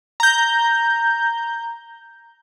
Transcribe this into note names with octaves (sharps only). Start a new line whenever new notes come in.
A#5 G6